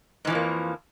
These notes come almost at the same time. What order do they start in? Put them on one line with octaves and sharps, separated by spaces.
G#2 E3 F3 F2 A#3